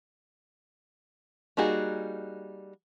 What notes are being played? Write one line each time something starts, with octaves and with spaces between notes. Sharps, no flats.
G3 A#3 D#4 F#4 G#4